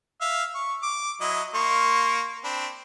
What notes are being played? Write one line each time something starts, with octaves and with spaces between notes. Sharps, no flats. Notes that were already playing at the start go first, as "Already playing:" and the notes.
E5 F5
C#6
D6
F#3 E4 D#5
A#3 C6 C#6
C4 D4 B5